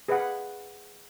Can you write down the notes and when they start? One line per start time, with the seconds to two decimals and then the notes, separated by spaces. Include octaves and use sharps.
0.08 G#4 B4 D#5 F5 F#5